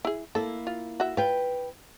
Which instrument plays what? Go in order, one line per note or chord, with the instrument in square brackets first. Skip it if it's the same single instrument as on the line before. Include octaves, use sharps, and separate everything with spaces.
[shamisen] E4 G#4
[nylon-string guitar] A#3 E4 [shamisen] A4
[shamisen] F4
F#4 E5
[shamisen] F4 [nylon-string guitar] B4 G5